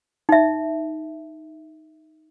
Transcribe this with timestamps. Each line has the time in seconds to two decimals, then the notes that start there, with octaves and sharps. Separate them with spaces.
0.29 D#4 E5